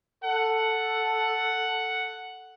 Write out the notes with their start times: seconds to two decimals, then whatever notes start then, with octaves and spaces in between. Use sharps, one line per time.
0.24 A4 F#5